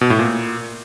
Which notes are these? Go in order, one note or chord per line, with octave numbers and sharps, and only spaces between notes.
B2
A2
A#2